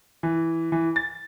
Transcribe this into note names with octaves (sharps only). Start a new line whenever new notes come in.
E3
E3
A6